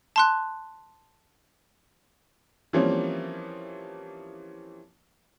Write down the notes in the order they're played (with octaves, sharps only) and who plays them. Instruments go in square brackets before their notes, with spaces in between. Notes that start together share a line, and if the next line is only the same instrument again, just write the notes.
[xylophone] A5 C6 F#6
[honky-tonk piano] E3 F3 G3 A#3 C4 C#4